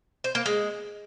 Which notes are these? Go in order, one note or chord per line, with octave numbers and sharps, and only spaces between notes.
C5
A#3
G#3